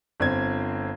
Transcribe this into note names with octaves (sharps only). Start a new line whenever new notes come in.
G1 C4 G#6